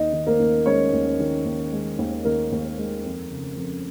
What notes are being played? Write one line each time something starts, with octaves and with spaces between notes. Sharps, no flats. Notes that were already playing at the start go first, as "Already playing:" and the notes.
Already playing: D#2 D#4 D#5
D#3
A#3 A#4
D#2
G#3 C#4 C#5
D#2
D#3
D#2
G#3
D#2
D#3 A#3 A#4
D#2
G#3
F2
C#3
F2